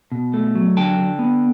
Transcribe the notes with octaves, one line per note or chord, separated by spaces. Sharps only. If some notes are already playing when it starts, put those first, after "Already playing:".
B2
A3
F#3
D3 G5 A5
D3
B3